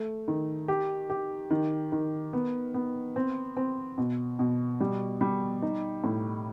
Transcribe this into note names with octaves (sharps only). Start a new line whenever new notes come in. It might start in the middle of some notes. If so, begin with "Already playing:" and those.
Already playing: A3
D#3
G4
G4
D#3
D#3
B3
B3
C4
C4
B2
B2
G3
G3
D#4
A2